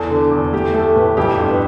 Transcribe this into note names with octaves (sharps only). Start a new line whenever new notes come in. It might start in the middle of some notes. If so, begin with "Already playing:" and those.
Already playing: E2 A4
D3
E2
A3 G4
A3 A4
A2 B4
F2 G4
G1
B4